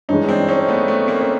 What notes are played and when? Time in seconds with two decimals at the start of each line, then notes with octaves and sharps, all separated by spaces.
0.09 G2 E3 G#3 C#4 D#4
0.29 C4 D4
0.48 C#4 D#4
0.68 A3 B3
0.88 A3 B3
1.08 A#3 C4
1.21 C#4